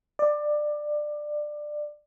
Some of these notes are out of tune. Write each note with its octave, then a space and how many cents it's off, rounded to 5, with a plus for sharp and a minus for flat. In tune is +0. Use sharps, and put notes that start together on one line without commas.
D5 +20